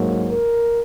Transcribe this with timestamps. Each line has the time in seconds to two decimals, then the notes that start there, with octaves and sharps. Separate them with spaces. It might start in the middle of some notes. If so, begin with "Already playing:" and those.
Already playing: G#2 F#3 A#3
0.31 A#4